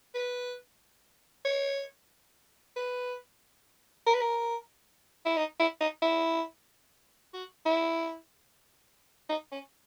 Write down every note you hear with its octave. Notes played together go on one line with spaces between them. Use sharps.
B4
C#5
B4
A#4
B4
A#4
E4
D#4
E4
D#4
E4
F#4
E4
D#4
C#4